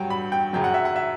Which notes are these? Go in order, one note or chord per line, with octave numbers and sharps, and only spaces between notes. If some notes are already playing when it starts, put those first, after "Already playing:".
Already playing: G2 F#3 G5
B5
G5
F#2 C#3 F#3 G5
F#5
E5
F#5
E5